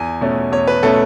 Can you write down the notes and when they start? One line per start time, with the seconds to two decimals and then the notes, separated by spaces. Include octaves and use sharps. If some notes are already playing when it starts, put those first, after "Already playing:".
Already playing: E2 G#5
0.21 B2 A3 C#4
0.52 E2 C#5
0.67 B4
0.83 B2 A3 C#4 A4